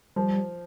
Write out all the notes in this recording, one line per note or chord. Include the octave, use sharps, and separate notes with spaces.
F3 G3